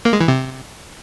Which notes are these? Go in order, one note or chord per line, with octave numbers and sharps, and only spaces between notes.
A#3
G#3
E3
C3